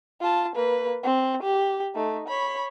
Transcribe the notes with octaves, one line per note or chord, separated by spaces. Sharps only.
F4 A5
A#3 B4
C4
G4
A3 D#4
C#5 B5